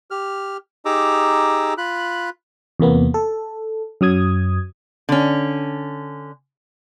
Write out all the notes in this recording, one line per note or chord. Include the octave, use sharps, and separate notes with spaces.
G4 F6
D#4 G4 G#4 A#5 D6 E6
F4 B5 F#6
E2 C3 A#3 B3
A4
F#2 F#3 D#6 G#6
D3 C#4